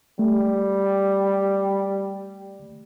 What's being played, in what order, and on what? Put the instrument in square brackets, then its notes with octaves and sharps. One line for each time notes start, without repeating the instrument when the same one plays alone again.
[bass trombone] G3 [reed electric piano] A3